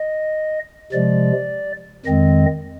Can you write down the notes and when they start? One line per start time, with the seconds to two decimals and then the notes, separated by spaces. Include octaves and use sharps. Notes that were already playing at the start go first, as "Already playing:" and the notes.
Already playing: D#5
0.93 C3 F3 G#3 D5
2.06 F2 D#3 G#3 C4 D#5